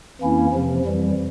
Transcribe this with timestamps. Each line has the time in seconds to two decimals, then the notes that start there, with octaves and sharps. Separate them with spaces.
0.21 F2 E3 A#3 C#4 E4
0.53 F2 C3 F3
0.85 F2 E3 G3